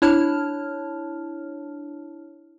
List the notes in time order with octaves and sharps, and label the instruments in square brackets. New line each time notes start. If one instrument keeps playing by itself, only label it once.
[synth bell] D4 E4 C#5 A5 F6